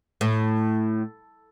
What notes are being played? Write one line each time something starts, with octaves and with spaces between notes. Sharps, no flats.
A2